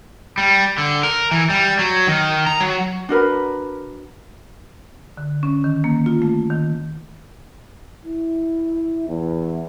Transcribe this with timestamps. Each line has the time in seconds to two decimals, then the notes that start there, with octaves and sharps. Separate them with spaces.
0.38 G3
0.78 D3
1.03 A#4
1.31 E3
1.50 G3
1.79 F#3
2.07 D#3
2.47 A#5
2.60 F#3
3.09 D4 F#4 A#4 B4
5.17 D3
5.43 C#4
5.64 D#3
5.84 A#3
6.06 F4
6.22 A3
6.50 D#3
8.05 E4
9.09 E2